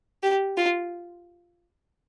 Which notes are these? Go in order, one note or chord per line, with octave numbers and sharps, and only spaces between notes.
G4
F4